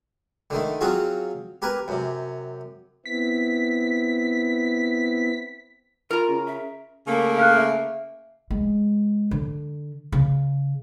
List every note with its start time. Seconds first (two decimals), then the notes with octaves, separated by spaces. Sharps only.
0.50 D3 D#3 A3
0.81 F#3 C4 C#4 F4 F#4 G#4
1.62 G4 A#4 B4 G#5
1.88 F#2 C3
3.06 B3 C4 E4 B6
6.11 F4 A#4 A#5
6.28 C#3
6.47 E5
7.07 C#3 A3 A#3
7.37 F5 F6 F#6
7.57 E5
8.51 G#3
9.31 D3
10.12 C#3